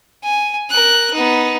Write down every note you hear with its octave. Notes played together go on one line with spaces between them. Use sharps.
G#5
A#4 F#6
B3 D#4